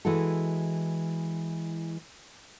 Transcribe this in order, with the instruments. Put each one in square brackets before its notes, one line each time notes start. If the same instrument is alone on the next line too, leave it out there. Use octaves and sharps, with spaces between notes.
[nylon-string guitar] E3 G#3 E4 F#4 A4